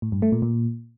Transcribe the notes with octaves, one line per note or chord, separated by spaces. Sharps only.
A2
G2
A3
A#2
A#2